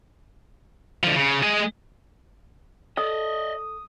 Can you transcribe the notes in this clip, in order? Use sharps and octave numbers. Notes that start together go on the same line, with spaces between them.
D3 F3
C#3
G#3 G#4
A4 D5 D#5 D#6